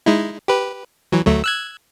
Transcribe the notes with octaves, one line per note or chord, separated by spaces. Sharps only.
G#3 D#4 E4
G4 B4
E3 F#3
D2 F#3 A3
E6 F#6 G#6